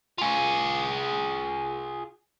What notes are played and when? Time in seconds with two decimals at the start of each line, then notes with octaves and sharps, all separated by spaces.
0.18 F4 G#4